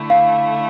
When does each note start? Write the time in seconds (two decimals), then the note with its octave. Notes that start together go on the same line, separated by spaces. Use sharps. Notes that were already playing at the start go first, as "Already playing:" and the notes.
Already playing: D3 A3 E4
0.10 F5